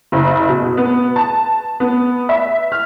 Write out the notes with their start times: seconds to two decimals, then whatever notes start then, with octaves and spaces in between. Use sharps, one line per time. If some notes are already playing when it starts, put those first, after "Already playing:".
0.12 F#1
0.49 B2
0.77 B3
1.16 A5
1.80 B3
2.29 E5
2.72 F6